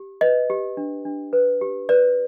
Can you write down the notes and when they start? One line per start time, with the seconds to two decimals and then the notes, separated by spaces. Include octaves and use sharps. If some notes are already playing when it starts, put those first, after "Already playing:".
Already playing: G4
0.21 B4 D#5
0.50 G4
0.77 D4
1.05 D4
1.33 B4
1.61 G4
1.89 B4 D5